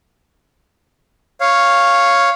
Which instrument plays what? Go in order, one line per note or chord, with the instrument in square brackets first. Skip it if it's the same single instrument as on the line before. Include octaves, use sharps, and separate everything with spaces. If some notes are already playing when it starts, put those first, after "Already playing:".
[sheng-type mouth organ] C#5 F5